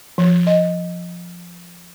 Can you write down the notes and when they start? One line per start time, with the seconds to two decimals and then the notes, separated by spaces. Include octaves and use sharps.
0.18 F3
0.47 D#5